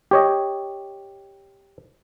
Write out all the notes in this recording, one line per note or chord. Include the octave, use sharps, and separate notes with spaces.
G4 C#5 D#5